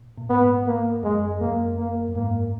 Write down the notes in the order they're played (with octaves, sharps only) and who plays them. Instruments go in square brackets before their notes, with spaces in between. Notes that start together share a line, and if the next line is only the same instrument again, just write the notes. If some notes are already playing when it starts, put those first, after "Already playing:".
Already playing: [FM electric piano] A#2
A#2
[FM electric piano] G#2 [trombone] B3
[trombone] A#3
[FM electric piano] F#2 [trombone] G#3
[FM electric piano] F#2 [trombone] A#3
[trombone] A#3
[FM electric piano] F#2
[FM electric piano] G#2 [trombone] A#3